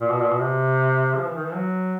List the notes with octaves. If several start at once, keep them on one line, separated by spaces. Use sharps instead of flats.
A#2
B2
A#2
B2
C3
F3
E3
D#3
E3
F#3